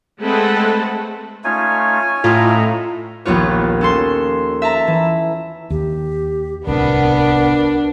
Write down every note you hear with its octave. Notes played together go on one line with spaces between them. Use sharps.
G#3 A3 C4 A4 B4 F#5
A3 C#4 D#4 F4 C#5 G#5
A2 F4 D#5 E5 A#5
A#1 D#2 B3 F4 C#5
C#4 A4 C6
E5 A5 A#5
E3
D#2 G4
D1 C2 B3 D4 A#4